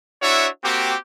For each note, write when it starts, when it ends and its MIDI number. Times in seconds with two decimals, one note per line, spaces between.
0.22 0.47 62
0.22 0.47 64
0.22 0.47 66
0.22 0.47 73
0.22 0.47 76
0.63 0.94 58
0.63 0.94 60
0.63 0.94 66
0.63 0.94 67